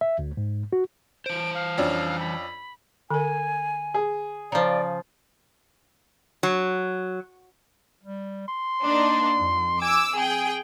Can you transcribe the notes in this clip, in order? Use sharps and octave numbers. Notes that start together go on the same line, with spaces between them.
E5
D2
G#2
F#4
E3 C5 D7
F5
F2 C#4 D4
B5
D3 A#4 G#5
G#4
C#3 F3 D5 A#5
F#3
G3
C6
A#3 D4 D#4
F2
G#5 D6 E6
C4 G#4 G5